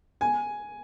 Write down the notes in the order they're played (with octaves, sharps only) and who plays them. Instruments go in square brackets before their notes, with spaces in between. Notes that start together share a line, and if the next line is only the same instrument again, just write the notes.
[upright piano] G#5